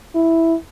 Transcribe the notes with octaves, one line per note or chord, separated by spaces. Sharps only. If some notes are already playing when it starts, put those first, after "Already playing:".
E4